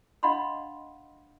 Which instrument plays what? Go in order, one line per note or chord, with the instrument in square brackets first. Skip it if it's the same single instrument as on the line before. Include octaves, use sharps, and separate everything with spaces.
[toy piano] D4 D#5 F5 F#5 B5 C6